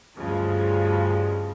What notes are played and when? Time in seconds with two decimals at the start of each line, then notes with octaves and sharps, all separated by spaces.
0.16 D2 G2 C#3 F3 G#3